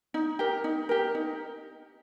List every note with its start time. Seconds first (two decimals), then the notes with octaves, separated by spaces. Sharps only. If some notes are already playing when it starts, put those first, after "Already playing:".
0.14 D#4
0.39 G4 A#4
0.64 D#4
0.89 G4 A#4
1.15 D#4